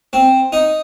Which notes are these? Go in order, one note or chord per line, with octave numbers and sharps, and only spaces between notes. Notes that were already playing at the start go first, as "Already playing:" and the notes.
C4
D#4